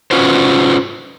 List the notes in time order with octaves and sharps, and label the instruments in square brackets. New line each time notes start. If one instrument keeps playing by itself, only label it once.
[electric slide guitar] C#4 F4 F#4 B4 C5